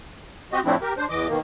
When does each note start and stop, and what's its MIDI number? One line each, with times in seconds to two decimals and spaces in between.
0.52 0.60 60
0.52 0.60 66
0.52 0.60 67
0.52 0.60 75
0.65 0.76 45
0.65 0.76 53
0.65 0.76 57
0.65 0.76 60
0.65 0.76 62
0.65 0.76 64
0.81 0.93 67
0.81 0.93 70
0.97 1.06 62
0.97 1.06 72
1.09 1.28 40
1.09 1.28 52
1.09 1.28 75
1.09 1.28 86
1.28 1.40 47
1.28 1.40 51
1.28 1.40 58